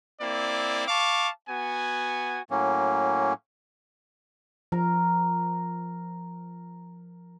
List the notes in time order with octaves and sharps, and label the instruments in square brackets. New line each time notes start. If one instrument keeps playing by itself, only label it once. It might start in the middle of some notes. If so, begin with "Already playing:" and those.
[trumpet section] A#3 C4 E4 D5
F5 A5 C#6 D6
B3 F#4 G#5
[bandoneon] A2 F#3 A#3 C#4
[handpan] F3 [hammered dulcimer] A#4 A#5